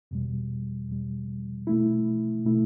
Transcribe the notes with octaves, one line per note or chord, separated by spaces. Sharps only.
E2 B2 G3
E2 B2 G3
B2 A3 E4
B2 A3 E4